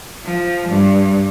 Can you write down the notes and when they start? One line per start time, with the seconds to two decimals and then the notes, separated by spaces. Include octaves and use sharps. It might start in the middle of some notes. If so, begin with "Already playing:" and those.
0.25 F3
0.69 G2